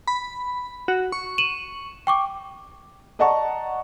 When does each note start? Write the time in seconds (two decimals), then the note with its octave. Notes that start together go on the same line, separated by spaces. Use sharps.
0.08 B5
0.88 F#4
1.12 C#6
1.38 D#7 E7 F#7
2.07 G5 C#6 D6
3.19 D5 D#5 F#5 A5 A#5 C#6